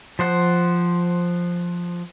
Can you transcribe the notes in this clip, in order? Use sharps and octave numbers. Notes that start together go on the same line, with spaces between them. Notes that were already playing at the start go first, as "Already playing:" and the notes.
F3 C5 F#5